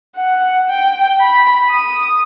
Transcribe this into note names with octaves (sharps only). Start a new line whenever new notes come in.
F#5
G5
B5
D#6